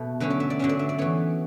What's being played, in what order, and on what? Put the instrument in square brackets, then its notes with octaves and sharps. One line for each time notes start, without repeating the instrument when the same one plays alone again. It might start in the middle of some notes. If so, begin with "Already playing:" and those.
Already playing: [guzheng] B2 A3
D3 F#3 C#4 B4
D5
E5
D5
D3 F#3 C#4 E5
D5
E5
D5
E3 B3 C#5